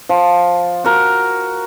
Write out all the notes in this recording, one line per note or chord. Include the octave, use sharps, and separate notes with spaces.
F3
F#4 A#4